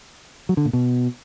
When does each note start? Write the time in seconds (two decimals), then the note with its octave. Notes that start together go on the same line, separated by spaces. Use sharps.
0.49 F#3
0.57 D3
0.65 A#2
0.73 B2